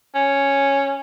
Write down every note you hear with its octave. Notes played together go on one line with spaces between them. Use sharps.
C#4